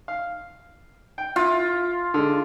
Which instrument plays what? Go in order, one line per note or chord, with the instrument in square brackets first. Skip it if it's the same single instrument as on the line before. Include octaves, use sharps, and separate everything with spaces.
[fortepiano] F5
G5
[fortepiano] E4 [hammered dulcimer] F4
[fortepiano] D3 G#3